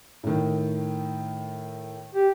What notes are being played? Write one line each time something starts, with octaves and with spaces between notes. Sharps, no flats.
A2 D#3
G4